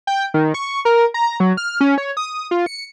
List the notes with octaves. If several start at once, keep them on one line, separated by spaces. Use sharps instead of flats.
G5
D#3
C#6
A#4
A#5
F#3
F6
C#4
C#5
D#6
F4
C#7